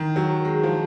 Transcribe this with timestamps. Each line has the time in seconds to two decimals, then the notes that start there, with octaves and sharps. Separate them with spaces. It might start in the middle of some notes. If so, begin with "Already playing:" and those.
Already playing: D#3
0.16 F#3
0.45 G#3
0.63 F3